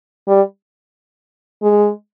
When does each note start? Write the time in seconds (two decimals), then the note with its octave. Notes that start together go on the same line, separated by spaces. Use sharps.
0.28 G3
1.63 G#3